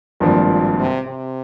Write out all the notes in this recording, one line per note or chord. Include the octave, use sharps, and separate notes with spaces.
G#1 G2 A#2 F3 A#3
A#2
C3
C3